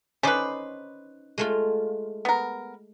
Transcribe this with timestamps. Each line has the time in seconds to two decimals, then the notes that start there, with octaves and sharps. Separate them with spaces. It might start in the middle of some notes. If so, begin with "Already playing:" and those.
0.23 C#4 D#4 B4 C5 D5
1.38 G#3 A3 F4
2.25 B3 A#4